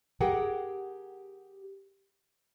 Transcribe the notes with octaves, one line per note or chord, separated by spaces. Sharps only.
G4 G#4 A#4 F#5 G5